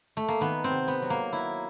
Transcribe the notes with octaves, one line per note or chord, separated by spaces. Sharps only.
A3
A#3
D#3 B3
C4
C3
B3
F#3
A#3
F#3 E4